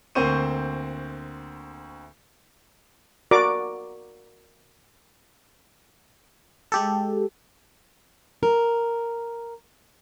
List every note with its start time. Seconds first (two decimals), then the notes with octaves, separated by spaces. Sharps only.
0.15 D2 A#3 C4 C5 C#6 D#7
3.31 F#4 A#4 D5 D6
6.72 G#3 G4 A4
8.43 A#4